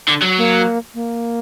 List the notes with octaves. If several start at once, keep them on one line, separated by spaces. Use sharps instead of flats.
D3
F#3
A#3
A#3